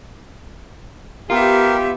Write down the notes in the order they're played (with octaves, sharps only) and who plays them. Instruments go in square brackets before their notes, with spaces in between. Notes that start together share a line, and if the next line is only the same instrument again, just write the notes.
[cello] B3 E5 [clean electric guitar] F4 [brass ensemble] G4 [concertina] A#4